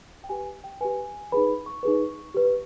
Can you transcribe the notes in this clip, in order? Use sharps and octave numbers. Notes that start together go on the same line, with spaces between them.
G5
G4 B4 G#5
G5
G4 B4 G#5
D#4 G#4 B4 B5
C#6
D#4 G#4 B4
G4 B4